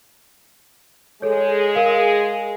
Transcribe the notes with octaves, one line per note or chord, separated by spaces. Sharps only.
G#3 G#4 A4 C#5
A#4 F5